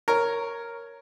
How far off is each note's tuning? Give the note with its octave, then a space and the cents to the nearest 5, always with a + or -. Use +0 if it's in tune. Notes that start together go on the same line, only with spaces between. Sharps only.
A#4 +0 C#5 +0